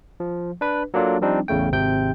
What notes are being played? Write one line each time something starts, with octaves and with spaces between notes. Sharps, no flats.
F3
D4 B4
F#3 A#3 D4 F4 A4
F3 G3 C4 D4 D#4
A1 E2 C#3 A3 G5
G#1 C3 G5 G6